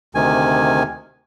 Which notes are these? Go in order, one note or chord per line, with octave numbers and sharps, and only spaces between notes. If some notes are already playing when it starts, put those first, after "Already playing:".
D2 C3 D#3 G#5